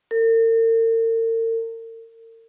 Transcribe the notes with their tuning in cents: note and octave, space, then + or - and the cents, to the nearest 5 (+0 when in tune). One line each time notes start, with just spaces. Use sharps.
A#4 -45